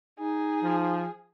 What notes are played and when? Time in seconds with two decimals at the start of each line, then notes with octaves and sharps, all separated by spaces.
0.19 D#4 G#4
0.62 F3